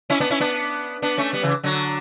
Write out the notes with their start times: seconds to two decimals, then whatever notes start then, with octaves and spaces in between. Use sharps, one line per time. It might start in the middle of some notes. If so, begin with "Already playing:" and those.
0.10 C#4 E4
0.20 B3 D4
0.30 C#4 E4
0.40 B3 D4
1.02 B3 D4
1.18 A3 C#4
1.33 G3 B3
1.43 C#3 E3
1.64 D3 F#3